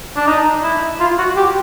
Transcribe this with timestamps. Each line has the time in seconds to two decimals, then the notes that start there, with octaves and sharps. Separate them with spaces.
0.16 D4
0.27 D#4
0.63 E4
1.00 F4
1.18 F#4
1.36 G4